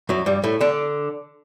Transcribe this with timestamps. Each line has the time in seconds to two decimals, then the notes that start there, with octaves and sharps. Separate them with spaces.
0.09 F#2 F#3
0.26 G2 G3
0.44 A2 A3
0.61 D3 D4